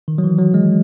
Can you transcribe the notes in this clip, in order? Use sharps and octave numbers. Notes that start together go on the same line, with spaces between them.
D#3
F#3
E3
F#3
G#3